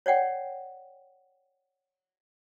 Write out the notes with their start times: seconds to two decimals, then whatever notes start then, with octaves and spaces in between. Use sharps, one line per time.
0.06 C#5 D5 F#5 G5